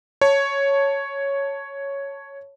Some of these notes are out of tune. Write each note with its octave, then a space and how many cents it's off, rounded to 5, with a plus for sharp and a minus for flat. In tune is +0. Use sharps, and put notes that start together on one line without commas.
C#5 +0 A5 +5